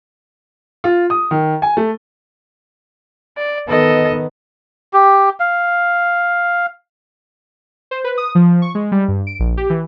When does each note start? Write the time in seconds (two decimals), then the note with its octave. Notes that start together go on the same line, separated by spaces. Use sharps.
0.84 F4
1.10 D#6
1.31 D#3
1.62 G#5
1.77 A3
3.38 D5
3.69 D#3 B3 A4 D#5
4.93 G4
5.40 F5
7.91 C5
8.04 B4
8.18 D#6
8.35 F3
8.62 C#6
8.75 G#3
8.92 G3
9.08 G2
9.27 D7
9.39 A#1
9.57 G4
9.70 E3